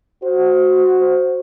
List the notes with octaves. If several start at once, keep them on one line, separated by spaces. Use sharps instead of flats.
F#4 C5